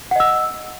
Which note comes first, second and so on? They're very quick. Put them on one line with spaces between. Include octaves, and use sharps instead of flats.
F#5 D#5 E6